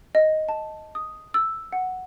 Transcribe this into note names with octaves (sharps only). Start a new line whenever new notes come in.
D#5
A5
D#6
E6
F#5